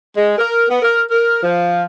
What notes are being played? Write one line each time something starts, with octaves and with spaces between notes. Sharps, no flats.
G#3
A#4
B3
A#4
A#4
F3